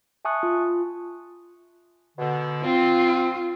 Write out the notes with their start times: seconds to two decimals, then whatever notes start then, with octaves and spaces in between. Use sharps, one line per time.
0.25 E5 G#5 A5 C#6 D#6 F#6
0.43 F4
2.17 B2 D3
2.64 C4 F4